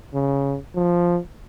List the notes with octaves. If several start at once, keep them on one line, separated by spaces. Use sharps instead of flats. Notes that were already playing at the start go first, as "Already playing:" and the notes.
C#3
F3